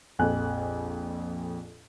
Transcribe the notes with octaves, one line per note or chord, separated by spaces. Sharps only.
A#1 F2 A4 G#5 F#6